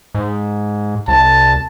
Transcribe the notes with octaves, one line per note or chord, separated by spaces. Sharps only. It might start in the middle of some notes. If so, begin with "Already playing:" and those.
G#2
C2 A5